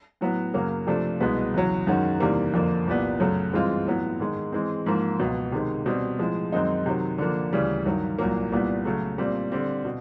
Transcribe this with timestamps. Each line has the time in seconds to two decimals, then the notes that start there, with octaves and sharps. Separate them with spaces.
0.21 A2 F#3 B3
0.54 F#2 C#3 F#3 A#3
0.87 C3 F3 A3 D4
1.20 C2 B2 G#3 B3
1.54 E2 C#3 F#3
1.87 F#2 D#3 G#3 C#4 F#4
2.20 E2 C3 D#3 G3 A#3
2.54 F2 D3 F3 A#3
2.86 C2 A#2 G3 B3
3.20 F#2 C#3 F#3 A3
3.53 G2 E3 G#3 C4 F4
3.87 A2 F#3 B3
4.20 G#2 D#3 G#3
4.52 E3 G#3 C4
4.86 G#2 F3 A#3
5.19 C#2 B2 F#3
5.52 C3 D#3 G#3
5.86 B2 G3 C4
6.19 A2 F3 G#3
6.52 F#2 D#3 G#3 C4 D#4
6.86 C3 D#3 F#3
7.18 D3 F3 A#3
7.53 D2 C#3 E3 G3
7.86 G2 D#3 F#3
8.18 C2 A#2 F#3 A#3
8.52 C2 A#2 G3 B3
8.85 C#3 F#3 A3
9.18 A#2 G3 C4
9.52 D3 G3 C4
9.85 B2